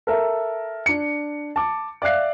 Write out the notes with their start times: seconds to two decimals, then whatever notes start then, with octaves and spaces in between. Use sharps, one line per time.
0.07 A4 A#4 E5
0.86 D4 C#7
1.56 A5 D6
2.02 D5 E5 F5 F#6 C7